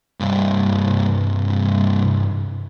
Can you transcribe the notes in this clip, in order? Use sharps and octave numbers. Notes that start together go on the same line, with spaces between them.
C2 G2